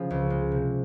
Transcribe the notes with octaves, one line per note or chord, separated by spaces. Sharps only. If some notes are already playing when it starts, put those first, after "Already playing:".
Already playing: C#3 F3 G#3
C#2
G#3
C3